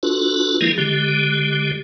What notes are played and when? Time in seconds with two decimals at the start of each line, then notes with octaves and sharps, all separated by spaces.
0.03 D4 F4 F#4 A4 B4
0.61 D#3 F3 G#3 A#3 E4 G#4
0.78 D3 G#3 G4